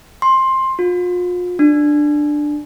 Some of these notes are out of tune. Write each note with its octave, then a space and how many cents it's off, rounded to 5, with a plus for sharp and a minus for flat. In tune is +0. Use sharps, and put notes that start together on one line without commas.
C6 +15
F4 +40
D4 +10